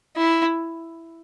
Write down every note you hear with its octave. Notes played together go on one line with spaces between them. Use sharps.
E4